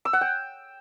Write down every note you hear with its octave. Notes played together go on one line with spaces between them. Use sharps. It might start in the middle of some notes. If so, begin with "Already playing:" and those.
E6
F#5
G5